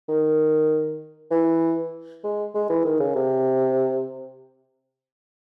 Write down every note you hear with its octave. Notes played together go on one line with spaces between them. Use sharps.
D#3
E3
G#3
G#3
E3
D#3
C#3
C3